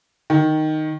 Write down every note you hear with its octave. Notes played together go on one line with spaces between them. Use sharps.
D#3